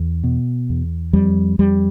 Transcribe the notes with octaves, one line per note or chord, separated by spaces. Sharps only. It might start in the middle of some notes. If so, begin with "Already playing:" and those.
Already playing: E2
B2
E2
F2 G3
F2 G3